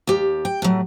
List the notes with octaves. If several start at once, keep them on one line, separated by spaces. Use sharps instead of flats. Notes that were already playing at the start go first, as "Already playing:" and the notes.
D#2 G4
G5
A2 F#3